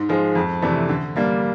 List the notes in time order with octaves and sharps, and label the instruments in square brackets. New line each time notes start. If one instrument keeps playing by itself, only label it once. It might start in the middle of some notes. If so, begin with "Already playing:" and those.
Already playing: [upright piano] G#2
F3 G#3
F2
C3 E3 A3 D4
D3
G3 A#3 D4